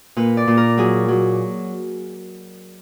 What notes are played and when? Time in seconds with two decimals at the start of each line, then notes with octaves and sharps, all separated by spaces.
0.17 A#2 B4
0.37 D5
0.48 A#2
0.57 A#4
0.78 F#3 G#4
1.08 F#3